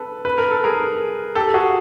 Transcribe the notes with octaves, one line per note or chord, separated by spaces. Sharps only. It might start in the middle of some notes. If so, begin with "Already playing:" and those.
Already playing: A4 B4
B4
A#4
A4
G#4 A#4
G4 A4
F#4 G#4